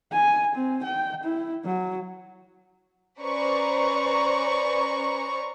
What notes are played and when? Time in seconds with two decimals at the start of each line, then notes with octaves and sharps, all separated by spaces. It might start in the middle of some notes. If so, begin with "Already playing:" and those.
0.12 G#5
0.55 C4
0.84 G5
1.24 E4
1.65 F#3
3.20 C#4 B4 C5 D5 A#5 C#6